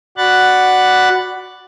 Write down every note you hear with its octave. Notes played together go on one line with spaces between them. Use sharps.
F#4 D5 F#5 B5 F#6 A6